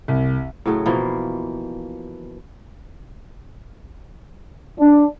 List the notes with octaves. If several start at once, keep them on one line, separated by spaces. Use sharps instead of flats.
C2
A2 C#3 F#3 A3
B2 E3 F3 A#3
D4